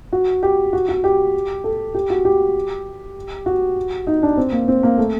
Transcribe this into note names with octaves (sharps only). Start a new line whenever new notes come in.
F#4
G4
F#4
F#4
G4
A4
G4
F#4
G4
F#4
D#4
D4
C4
A#3
C4
A#3
A3